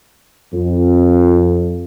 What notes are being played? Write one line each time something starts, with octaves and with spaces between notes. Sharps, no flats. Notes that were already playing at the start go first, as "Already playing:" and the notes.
F2